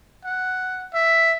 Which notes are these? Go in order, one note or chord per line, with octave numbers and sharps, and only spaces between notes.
F#5
E5